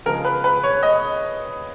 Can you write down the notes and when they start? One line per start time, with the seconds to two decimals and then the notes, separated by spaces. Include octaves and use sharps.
0.06 C#3 F3 G#3 A#4
0.25 B4
0.44 B4
0.63 C#5
0.83 D#5